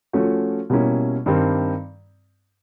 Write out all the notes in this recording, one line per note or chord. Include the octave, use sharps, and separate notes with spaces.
F3 A3 C#4 F#4
B2 G3 A#3 C#4 E4
G2 D#3 G3 C4